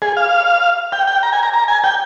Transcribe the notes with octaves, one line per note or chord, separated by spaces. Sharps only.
G#4
F5
G5
G5
A#5
G#5
A#5
A#5
G#5
G5